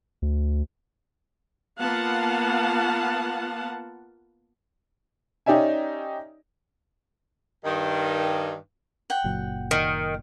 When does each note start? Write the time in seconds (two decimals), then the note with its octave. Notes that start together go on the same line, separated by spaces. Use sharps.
0.22 D2
1.79 A#3 B3 F4 F5 F#5 A5
5.46 C#4 D#4 G4 D5 E5 G#5
7.64 G2 D#3
9.10 F#5 G5
9.24 F#1 A#2 F#3
9.71 D#3